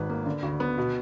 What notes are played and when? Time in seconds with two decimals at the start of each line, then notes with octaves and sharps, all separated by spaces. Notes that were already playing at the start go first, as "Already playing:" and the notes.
Already playing: G#1 G#2 B4
0.09 A#3
0.26 D3
0.43 D2
0.60 B3
0.78 B2